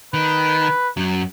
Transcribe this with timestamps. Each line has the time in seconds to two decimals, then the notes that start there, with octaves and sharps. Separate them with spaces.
0.14 D#3 B4
0.97 F#2 F#3